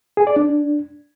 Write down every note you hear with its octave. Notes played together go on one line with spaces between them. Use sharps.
G#4
D5
D4